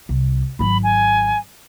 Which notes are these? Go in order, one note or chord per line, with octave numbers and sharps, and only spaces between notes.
C2
G#1 F#3 B5
G#5